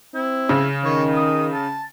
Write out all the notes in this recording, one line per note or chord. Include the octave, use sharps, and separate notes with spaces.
C4 E4
C#3
D#3 C#5
D#6
A5